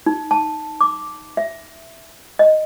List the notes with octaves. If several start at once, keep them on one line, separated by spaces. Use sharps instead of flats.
D#4
A5
D6
E5
D#5